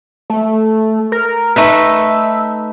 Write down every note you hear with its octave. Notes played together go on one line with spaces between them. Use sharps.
A3
A#4
A3 D#4 B4 E5